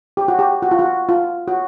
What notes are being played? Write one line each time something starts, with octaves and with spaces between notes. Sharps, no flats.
G4
F#4
G4
F#4
F4
F#4
F4
F#4